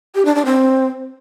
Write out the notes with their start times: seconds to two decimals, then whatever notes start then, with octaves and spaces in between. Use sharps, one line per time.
0.15 G4
0.25 D4
0.35 D4
0.45 C4